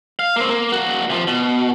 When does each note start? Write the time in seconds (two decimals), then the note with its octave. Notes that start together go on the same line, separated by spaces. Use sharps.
0.19 F5
0.36 A#3 C4
0.50 A#3
0.72 A#3 F#4
1.10 C3 F3
1.27 B2